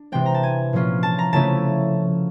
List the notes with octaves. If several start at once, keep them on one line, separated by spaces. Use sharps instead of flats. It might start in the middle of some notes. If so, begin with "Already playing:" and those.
Already playing: D4
C3 E3 G#3 C4 G5
A#5
A5
G#5
A#2 F3 A#3 C#4 F4
A5
A#5
C#3 F3 A3 C#4 E4 A5